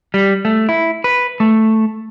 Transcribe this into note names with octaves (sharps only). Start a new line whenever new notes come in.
G3
A3
E4
B4
A3